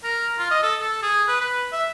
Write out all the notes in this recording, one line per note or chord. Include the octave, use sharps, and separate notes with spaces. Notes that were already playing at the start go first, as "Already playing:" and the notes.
A#4
F4
D#5
A4
A4
G#4
B4
B4
E5